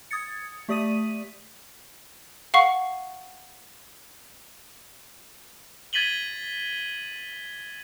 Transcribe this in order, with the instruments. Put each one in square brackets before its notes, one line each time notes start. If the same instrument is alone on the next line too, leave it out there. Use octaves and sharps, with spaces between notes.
[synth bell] D#6 G#6 A6 C#7
A3 G4 D5 D#6 B6 D#7
[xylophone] F5 F#5 C#6 C7
[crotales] G#6 A6 B6 D#7 F#7 G7